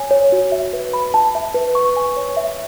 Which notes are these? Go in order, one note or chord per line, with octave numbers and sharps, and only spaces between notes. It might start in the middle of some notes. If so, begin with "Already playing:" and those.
Already playing: C#5 G#5
C#5
F#4
E5
B4
B5
A5
E5
B4
C#6
G#5
C#5
E5